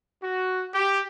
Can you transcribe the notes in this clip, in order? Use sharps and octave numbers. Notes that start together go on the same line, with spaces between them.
F#4
G4